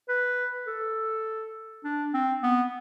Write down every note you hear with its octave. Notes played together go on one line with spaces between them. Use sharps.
B4
A4
D4
C4
B3